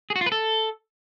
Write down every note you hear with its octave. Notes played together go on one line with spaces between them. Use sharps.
G#4
F#4
F4
B4
A4